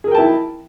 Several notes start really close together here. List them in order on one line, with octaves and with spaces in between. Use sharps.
G#4 A#4 G5 A5 E4